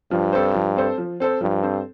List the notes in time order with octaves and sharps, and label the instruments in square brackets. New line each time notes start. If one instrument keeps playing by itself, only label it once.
[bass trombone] G2 [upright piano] F3
[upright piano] C4 A4 C5
F3
C4 A4 C5
F3
C4 A4 C5
[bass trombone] G2 [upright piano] F3
[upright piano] C4 A4 C5